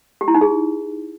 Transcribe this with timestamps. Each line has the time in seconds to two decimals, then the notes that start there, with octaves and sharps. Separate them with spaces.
0.21 G4
0.28 E4
0.35 D#4
0.41 G#4